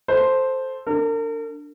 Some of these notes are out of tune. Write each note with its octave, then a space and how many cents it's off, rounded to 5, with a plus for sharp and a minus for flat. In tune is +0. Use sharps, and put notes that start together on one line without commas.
A4 -5 C5 +0
D4 +0 A#4 -40